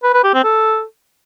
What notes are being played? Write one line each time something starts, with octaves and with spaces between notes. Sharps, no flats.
B4
B4
G4
C4
A4